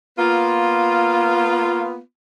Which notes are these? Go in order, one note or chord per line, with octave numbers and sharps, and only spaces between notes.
A#3 B3 F4